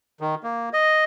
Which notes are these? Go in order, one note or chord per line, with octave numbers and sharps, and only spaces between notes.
D#3
A#3
D#5